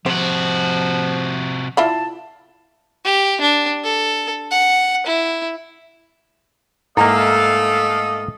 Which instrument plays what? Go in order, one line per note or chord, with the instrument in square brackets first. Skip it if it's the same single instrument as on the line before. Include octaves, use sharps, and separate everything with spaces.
[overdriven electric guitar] C3 F#4 [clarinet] F3 [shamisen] C5
[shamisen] E4 F4 B5 [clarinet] A5
[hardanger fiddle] G4
D4
A4
F#5
E4
[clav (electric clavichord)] G#2 A#3 [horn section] A3 A4 F5 [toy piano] E4 [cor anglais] D#5